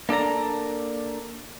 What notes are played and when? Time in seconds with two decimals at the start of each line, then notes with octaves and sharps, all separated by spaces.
0.09 A#3 D4 A4 D5 A#5